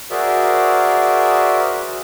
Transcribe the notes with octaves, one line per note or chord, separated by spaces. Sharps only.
F#4 G#4 A#4 C5 D5 E5